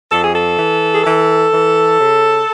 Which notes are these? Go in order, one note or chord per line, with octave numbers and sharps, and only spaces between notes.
F2 A4
G#4
A4
E3
G#4
E3 A4
E3
C#3